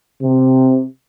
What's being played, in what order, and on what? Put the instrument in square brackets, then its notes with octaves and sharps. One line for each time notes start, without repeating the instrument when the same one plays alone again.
[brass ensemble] C3